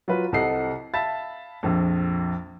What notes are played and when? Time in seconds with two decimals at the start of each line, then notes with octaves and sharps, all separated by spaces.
0.08 F#3 F4 B4
0.32 C2 C3 A4 D#5 F#5 C7
0.94 E5 F5 A5 B5 A6
1.63 A#1 F2